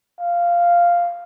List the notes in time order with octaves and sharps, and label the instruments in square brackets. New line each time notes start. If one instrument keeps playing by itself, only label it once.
[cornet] F5